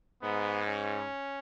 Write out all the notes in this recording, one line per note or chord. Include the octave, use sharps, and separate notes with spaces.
G#2 B3
C#4